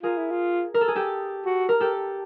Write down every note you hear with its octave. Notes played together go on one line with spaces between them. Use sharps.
F4 G#4 A#4
E4
F4
A#4
A4
G#4
G4 A4
F#4
A#4
G4 A4